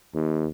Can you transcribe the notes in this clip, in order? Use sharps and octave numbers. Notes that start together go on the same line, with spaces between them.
D#2